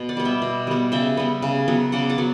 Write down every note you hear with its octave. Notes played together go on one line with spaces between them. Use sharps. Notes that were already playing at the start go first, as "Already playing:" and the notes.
Already playing: B2
D5 F#5
G3 B3
E5 G5
B2
G3 B3
C#3 E5 G5
G3 B3
C#3
F#3 B3
C#3 D5 F#5
D5 F#5
F#3 B3